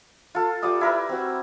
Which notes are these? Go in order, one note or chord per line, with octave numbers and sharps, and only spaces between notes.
F4 A4
G3 F4 D6 D#6
E4 A#4 B4
C4 F#4